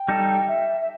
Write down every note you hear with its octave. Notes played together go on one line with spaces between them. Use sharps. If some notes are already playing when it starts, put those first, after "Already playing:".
Already playing: G5
G3 D#4 A4
E5
E5